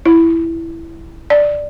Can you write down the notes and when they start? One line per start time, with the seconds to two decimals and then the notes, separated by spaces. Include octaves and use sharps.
0.06 E4
1.30 D5